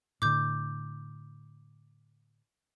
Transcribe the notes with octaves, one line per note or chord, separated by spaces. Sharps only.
A2 D3 D6 G6